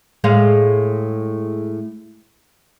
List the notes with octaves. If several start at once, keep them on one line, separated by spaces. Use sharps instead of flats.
A2 G#3 F5